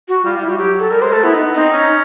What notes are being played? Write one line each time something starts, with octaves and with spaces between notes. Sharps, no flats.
F#4
G3 F4
G3 F4
E4
G3 F#4
F#3 G4
A4
G3 A#4
G#3 C5
A3 A4
B3 E4
D#4
B3
C4 D#4
C#4